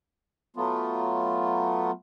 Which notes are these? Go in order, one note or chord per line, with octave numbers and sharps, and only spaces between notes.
F#3 A3 B3 F4